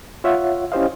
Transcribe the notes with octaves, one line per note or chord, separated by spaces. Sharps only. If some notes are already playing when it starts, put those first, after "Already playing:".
F4 C#5 E5 F#5
C#4 E4 G4 C5 D#5 F5